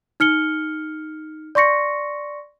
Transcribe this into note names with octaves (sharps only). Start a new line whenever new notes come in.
D#4 F6 C#7 G7
D5 C6 C#6 A#6 C#7